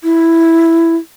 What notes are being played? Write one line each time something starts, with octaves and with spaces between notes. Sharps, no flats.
E4